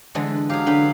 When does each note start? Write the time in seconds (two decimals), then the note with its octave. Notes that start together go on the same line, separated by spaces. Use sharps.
0.15 D3 E3 G#3
0.50 F#3 G4 G#4 F5
0.66 D3 B4 G5 B5